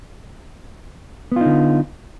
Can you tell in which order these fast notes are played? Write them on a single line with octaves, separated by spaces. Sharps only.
B3 F4 D#4 D3